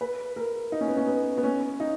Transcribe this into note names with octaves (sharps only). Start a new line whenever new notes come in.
B4
A#4
D#4
C#4
B3
C#4
B3
B3
C#4
D#4